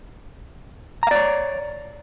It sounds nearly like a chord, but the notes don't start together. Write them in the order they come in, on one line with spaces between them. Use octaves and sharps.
A#5 F5 D5 C#5